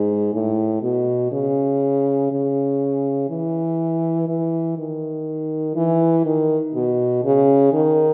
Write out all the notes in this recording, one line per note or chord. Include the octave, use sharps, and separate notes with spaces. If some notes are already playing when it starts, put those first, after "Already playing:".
Already playing: G#2
A2
B2
C#3
C#3
E3
E3
D#3
E3
D#3
B2
C#3
D#3